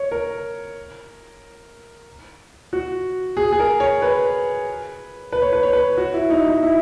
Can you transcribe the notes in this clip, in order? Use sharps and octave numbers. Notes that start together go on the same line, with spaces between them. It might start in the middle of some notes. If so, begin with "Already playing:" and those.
Already playing: C#5
A#4
F#4
G#4
G#4
A#4
C#5
B4
B4
C#5
B4
C#5
B4
F#4
E4
D#4
D#4
E4